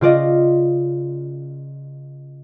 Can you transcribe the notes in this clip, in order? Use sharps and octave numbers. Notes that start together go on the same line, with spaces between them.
C#3 F4 D5 D#5